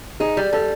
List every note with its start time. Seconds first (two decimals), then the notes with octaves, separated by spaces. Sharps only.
0.20 D#4 G#4
0.37 G3
0.53 G3 A4